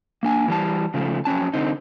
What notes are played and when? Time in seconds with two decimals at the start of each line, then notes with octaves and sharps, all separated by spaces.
0.23 A#3 D4 G#5
0.48 E3 G3 A5
0.94 C#3 F3 A3
1.25 F2 F#3 C#4 A5
1.54 D3 C4 D#4